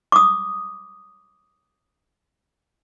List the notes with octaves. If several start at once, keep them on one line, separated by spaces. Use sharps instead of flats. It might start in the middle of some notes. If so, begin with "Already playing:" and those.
D6 D#6